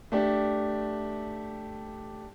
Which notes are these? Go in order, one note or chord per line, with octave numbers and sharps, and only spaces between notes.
A3 D4 G4